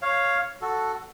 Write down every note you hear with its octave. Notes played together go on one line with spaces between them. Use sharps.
C#5 F5
F#4 A4